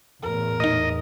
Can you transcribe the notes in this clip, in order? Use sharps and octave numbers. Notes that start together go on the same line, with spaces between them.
E2 A2 A#4
A#2 D#4 D#5